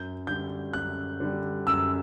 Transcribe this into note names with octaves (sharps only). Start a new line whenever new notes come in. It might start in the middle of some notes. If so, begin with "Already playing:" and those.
Already playing: F#2 G6
D3 G3 G6
F#2 F#6
D3 G3
F#2 E6